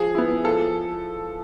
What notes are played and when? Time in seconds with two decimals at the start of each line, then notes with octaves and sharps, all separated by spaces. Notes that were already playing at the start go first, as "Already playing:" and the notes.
Already playing: F3 G#4
0.15 B3 E4
0.44 F3 A4